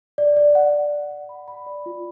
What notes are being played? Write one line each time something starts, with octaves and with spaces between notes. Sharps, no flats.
D5
D5
F#5
D5
F#5
F#5
B5
B5
D5
F4